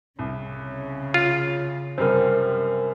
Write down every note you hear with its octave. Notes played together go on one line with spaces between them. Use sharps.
C2 C#3
F4
F#2 C3 G3 A#4 C5